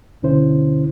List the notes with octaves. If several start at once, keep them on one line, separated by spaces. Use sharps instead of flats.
D2 B2 D3 C#4 E4 C5